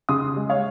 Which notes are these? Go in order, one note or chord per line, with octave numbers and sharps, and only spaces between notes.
C#3 C6 D#6
G#3
C#5 F5